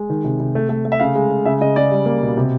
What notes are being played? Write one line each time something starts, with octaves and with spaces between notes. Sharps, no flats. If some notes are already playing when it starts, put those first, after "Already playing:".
Already playing: G#3
D#3
C3
C3
A3
A3
A3
E5
C#3 F5
G#3
G#3
C#3 E5
C#3 D#5
C#3 D5
G3
A#3
B2
C3